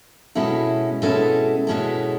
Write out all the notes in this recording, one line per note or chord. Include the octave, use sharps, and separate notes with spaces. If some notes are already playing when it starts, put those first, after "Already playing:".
B2 G#3 C#4 E4 A4
B2 G#3 C#4 E4 A4
B2 G#3 C#4 E4 A4